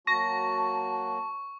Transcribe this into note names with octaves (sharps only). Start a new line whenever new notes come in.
F#3 A#3 F#4 A5 C#6 A#6